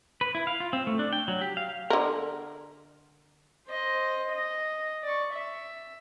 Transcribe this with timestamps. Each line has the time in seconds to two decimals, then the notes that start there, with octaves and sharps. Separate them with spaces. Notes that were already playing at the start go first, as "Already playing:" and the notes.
0.21 B4
0.35 E4
0.47 F5
0.60 F4
0.73 C4
0.87 A3
0.99 D4
1.13 G5
1.28 F#3
1.41 G4
1.57 F5
1.90 D3 A#4
3.69 C5 D#5
4.32 D#5
5.04 D5 C#6
5.33 E5